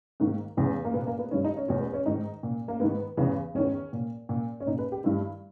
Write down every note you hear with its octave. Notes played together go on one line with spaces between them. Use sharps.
G#2 D#3 A#3
E2 C#3 E3
A#3
A#2 B3
A#3
B3
G2 D#3 C#4
D#4
C#4
E2 B2 C#4
B3
C#4
G#2 D#3 D#4
A#2
A#3
G#2 D#3 B3
E2 C#3 E3
E2 D#3 C#4
A#2
A#2
C#4
A#2 D#4
B4
G4
G2 D#3 E4